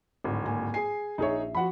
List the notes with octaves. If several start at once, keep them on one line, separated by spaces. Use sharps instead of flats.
D1 G#1
A#3 G#5
G#4 G#5 C7
A#1 D#4 G#4 C#5 E5
F3 F#4 F#5 B5